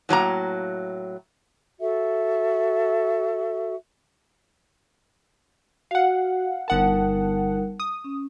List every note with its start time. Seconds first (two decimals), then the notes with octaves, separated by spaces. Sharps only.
0.09 A2 F#3 A#3 A#5
1.80 F#4 A4 E5
5.91 F#4 F5 F#5
6.68 G1 G3 D#4 A#4 F#5 A5
7.80 D#6
8.04 C#4